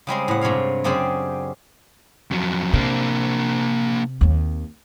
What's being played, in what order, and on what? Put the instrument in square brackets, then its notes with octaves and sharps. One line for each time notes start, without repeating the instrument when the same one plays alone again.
[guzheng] C#3 G3 G#3 C4
A2 F#5
G2 C3 G#3 C#5 F5
F#2 C#3 C4 G4 G#4 D5
[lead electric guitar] F2 F#3
[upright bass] C3 [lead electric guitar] A#3 D4
[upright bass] D#2 C4